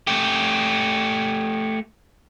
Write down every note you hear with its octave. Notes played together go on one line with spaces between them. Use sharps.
A3 G4